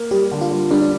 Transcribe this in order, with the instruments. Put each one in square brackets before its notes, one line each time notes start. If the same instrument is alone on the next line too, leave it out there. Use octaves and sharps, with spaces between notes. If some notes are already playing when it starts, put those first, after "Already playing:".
Already playing: [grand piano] A#3
[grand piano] G3 [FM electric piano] G4
[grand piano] D3
[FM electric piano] F4
[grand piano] G3
[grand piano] G3 [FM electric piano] D4
[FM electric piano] D4